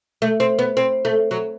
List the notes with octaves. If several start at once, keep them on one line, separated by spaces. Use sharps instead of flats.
A3
C4
B3
C4
A3
F#3